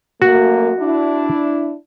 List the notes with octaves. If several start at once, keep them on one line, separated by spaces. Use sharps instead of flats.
F#2 A3 A#3 F#4
D4 E4